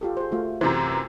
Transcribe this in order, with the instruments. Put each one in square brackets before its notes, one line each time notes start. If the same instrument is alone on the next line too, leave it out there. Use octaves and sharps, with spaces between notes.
[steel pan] F4 G4 A4
G#4 C5
A3 F4 F#4
[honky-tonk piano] F#2 C3 E3 [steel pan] C5